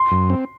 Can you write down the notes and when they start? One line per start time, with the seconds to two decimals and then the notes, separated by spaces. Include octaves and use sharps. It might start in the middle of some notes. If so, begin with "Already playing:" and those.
Already playing: C6
0.11 F#2
0.30 C4